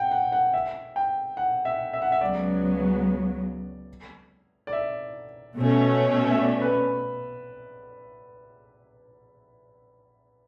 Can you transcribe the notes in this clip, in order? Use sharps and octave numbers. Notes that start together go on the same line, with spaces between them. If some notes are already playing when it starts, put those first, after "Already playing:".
Already playing: F#5 G5
F#5
F#5
E5
G5
F#5
E5
E5
F#5
E5
C#2 C#3 F#3 B3 D5
D5
E5
B2 A3 C#4
E5
D5
B4